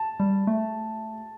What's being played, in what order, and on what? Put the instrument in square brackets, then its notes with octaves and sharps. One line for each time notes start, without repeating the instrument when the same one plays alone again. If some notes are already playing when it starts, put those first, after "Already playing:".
Already playing: [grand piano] A5
[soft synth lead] G3
A3